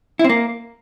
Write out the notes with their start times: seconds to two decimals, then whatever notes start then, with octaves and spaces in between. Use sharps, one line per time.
0.19 E4
0.24 C4
0.29 A#3